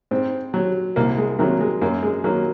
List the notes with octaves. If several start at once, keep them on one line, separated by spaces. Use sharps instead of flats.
G#2 C4
F#3
C2 A#3
G#3
C3 D#3 F#3 A#3
G#3
F#2 A#3
G#3
D#3 F#3 A#3